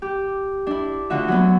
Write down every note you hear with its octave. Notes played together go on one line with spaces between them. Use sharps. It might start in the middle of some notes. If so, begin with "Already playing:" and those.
G4
D4 E4
D2 D3 F4 F#4 E5
F#3 B3